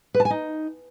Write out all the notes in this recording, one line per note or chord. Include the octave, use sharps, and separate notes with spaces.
B4
A5
G#5
D#4